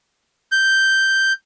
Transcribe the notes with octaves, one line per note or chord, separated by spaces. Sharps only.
G6